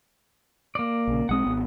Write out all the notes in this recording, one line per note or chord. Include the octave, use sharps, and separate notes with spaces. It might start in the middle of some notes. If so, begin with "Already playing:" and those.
A#3 D5
A#1 C#3
B1 G#3 C4 F#5 D#6
G#1 B3